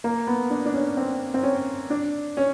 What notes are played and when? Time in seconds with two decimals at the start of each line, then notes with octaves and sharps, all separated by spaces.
0.04 A#3
0.27 B3
0.50 D4
0.65 D4
0.73 C#4
0.97 C4
1.34 C4
1.43 C#4
1.90 D4
2.37 C#4